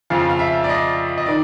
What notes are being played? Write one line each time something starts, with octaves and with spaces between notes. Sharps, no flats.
F2 C#3 F3 F5
F5
E5
D5
D#5
D#5
D#3 D5